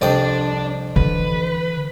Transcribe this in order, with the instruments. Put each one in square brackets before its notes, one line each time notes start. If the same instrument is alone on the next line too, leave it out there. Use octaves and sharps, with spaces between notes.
[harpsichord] C2 F2 G5 [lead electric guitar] D4 D5
[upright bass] D3 E3 [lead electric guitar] B4